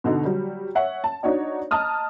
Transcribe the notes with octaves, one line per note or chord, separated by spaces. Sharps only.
B2 D3 D#4
F#3 G3
C#5 E5 F#5
A5
D4 D#4 F#4 C#5 D5
D#5 A5 A#5 D#6 F6